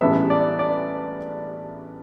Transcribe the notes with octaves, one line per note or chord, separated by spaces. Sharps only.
A1 G2 E3 G#3 B3 E5
D5
D5